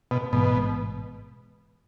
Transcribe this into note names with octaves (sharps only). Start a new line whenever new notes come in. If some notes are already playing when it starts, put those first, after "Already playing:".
B2
A1 G#2 B2 E3 G#3